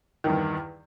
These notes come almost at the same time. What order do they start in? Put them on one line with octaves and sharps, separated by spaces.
D#3 E2 G2